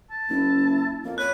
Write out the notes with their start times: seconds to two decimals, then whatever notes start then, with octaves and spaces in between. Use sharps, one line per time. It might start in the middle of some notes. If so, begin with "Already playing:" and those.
0.10 A5
0.30 F#1 E4
1.04 F2 A#3
1.18 B4 C#5 F#6